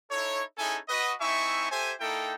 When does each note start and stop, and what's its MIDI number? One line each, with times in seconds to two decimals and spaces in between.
0.11 0.43 63
0.11 0.43 64
0.11 0.43 69
0.11 0.43 73
0.58 0.79 61
0.58 0.79 63
0.58 0.79 64
0.58 0.79 68
0.58 0.79 69
0.58 0.79 80
0.89 1.13 66
0.89 1.13 71
0.89 1.13 75
1.21 1.68 60
1.21 1.68 63
1.21 1.68 64
1.21 1.68 76
1.21 1.68 80
1.21 1.68 85
1.71 1.93 67
1.71 1.93 69
1.71 1.93 72
1.71 1.93 76
1.71 1.93 80
2.01 2.35 58
2.01 2.35 63
2.01 2.35 64
2.01 2.35 69
2.01 2.35 79